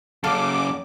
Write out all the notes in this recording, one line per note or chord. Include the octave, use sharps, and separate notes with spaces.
F#2 C#3 A4 F5 D6